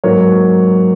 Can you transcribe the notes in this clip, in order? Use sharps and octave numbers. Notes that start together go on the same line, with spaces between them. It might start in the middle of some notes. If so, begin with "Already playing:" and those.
G#2 F#3 A#3 C#5